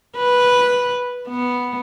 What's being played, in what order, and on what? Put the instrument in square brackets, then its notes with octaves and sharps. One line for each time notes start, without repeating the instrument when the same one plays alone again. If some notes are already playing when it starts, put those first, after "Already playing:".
[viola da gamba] B4
B3